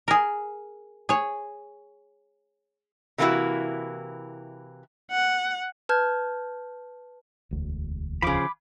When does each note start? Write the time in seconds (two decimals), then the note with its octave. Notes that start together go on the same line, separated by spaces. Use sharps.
0.08 G#4 A#4
1.09 G#4 C#5
3.18 C3 E3 A#3 B3 E4 F#4
5.11 F#5
5.89 B4 A5 F6 G6 G#6
7.51 E1 D2
8.22 C#3 F3 B5 D6